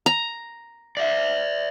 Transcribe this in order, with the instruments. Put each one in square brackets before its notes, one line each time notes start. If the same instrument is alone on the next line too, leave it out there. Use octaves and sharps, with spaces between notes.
[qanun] A#5
[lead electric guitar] D5 E5